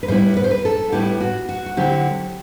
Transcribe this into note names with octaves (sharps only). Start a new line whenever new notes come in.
B4
A2 G3 B3 E4 C5
B4
C5
B4
A4
A2 G3 B3 E4 G4
F#4
F#4
F#4
D3 F#3 C4 E4 G4